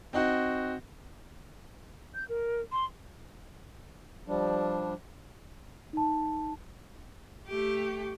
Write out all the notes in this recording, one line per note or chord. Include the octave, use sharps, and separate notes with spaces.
C4 D#4 F#4
G6
A#4
C6
F3 G3 D4
D#4 A5
A3 G4